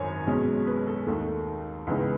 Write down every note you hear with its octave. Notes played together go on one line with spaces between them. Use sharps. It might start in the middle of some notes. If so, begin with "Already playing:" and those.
Already playing: G#1 F#2 D#3 C#5 G#5
B1 B2 G#3 C#4
B4
A4
D#2 D#3 A3 D#4 A4
C#2 C#3 E3 B3 D#4